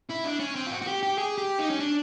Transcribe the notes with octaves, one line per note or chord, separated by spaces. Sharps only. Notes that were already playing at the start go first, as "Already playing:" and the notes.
E4
D4
C#4
C4
F4
F#4
F#4
G4
G4
G#4
G4
D#4
C#4
D4